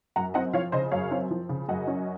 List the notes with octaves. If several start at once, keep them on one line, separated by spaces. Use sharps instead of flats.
F#2 F#5 A#5
C4 D#5 F#5
F3 C#5 F5
C#3 C5 D#5
F#2 C#5 F5
C4
F3
C#3
F#2 D#5 F#5
C#4